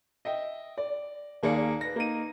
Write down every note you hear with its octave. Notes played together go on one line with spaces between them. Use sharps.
D#5 E5 G5
D5
D#2 A#3 G#4 D5 C#7
B4 A#6
A#3 D#4 D#7